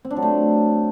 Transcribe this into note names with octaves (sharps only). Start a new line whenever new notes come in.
C4
D4
F#3
A3